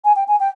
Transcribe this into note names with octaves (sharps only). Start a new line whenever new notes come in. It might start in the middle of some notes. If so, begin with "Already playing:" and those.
G#5
G5
G#5
G5